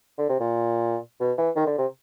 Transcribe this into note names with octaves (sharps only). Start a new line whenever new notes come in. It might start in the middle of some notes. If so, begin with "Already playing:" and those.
D3
C3
A#2
B2
E3
D#3
D3
C3